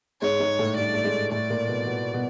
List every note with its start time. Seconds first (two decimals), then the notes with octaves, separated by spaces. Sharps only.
0.22 G#2 G#3 C#5
0.40 G#2 G#3
0.59 A2 A3
0.76 G2 G3 D5
0.94 A3
1.04 G#2 G#3
1.31 A2 A3 D5
1.50 A#2 A#3
1.68 B2 B3
1.86 B2 B3
2.14 B2 B3